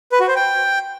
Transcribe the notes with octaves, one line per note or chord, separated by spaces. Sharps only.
B4
F#4
C5
G5